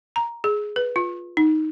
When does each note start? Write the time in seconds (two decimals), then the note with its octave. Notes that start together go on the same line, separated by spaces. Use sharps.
0.16 A#5
0.44 G#4
0.76 B4
0.96 F4
1.37 D#4